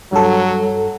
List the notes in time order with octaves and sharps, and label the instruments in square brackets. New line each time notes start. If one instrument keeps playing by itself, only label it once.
[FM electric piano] G2 A4 [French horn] F#3